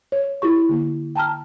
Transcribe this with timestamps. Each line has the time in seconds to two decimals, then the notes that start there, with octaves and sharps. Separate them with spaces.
0.12 C#5
0.42 E4 F4 G4 C#6
0.69 D3 A#3
1.16 G5 A5 A#5 F6